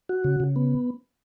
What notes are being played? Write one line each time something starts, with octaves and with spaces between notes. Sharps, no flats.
F#4
C#3
C#3
B3